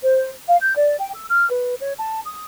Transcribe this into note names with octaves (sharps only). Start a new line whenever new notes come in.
C5
F5
G6
D5
G5
E6
F6
B4
C#5
A5
D#6